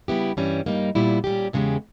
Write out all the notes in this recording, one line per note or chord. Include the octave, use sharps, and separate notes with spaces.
C#3 G3 B3 E4 G4
G2 E3 G3 C#4
G2 G3 A#3 D#4
A#2 G3 B3 E4
A#2 G3 C#4 G4
E2 C#3 G#3 B3 G4